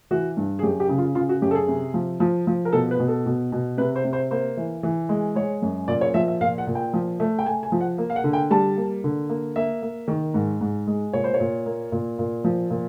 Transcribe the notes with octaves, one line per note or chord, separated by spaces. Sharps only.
E3 F#4
G2
G#4
F#2 G4
G4
C#3
F4
C#3 F4
F#4
F#2 G4
A4
G#4
C3
F3
F3
F3
A#4
B2 A4
B4
B2
A4
B2
B2
C3 B4
C5
C3
C5
A#3 C5
E3
E3
G#3
G#3 C#5
F#2
A#2 D5
C#5
F3 E5
E5
A#2 F5
F#5
A#2
G5
F3
A3
G5
A3 G#5
G#5
F3
F#5
A#3
F5
F#5
D3
G5
G3 A5
A#3
D3
A#3
A#3 E5
A#3
D#3
G#2
G#2
G#3
A#2 C#5
C5
C#5
A#2
A#3
A#2
A#2
F3
A#2